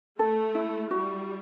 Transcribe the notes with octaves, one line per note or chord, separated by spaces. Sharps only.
A3 A4
E4
G3 F#4